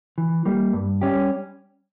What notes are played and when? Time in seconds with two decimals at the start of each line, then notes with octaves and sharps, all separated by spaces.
0.18 E3
0.45 G3 A#3
0.73 G2
1.01 G3 C#4 G4